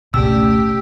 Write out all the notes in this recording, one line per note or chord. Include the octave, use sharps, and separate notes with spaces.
G#1 C#2 B2 A3 C#4 G4 D5 E6